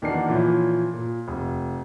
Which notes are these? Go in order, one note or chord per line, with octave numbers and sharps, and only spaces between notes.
E2 D#3 A#3 D4 F#4 C7
A#2 E3 F3 C#4
A#2
F1